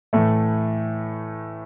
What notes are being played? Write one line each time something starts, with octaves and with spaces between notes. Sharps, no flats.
A2 E3 A3